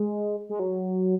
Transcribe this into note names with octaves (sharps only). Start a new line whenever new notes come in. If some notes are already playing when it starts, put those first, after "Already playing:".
Already playing: G#3
G#3
F#3